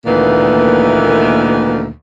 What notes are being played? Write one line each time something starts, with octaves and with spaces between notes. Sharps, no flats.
D2 A#2 D#3 E3 A#3 B3